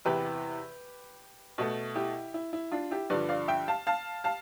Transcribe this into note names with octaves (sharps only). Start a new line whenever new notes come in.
E2 C3 E3 G4 B4
B2 A3
E4 G4
E4
E4
D4 F4
E4 G4
G2 D3 F3 B4 D5
D5 F5
E5 G5
F5 A5
F5 A5
F5 A5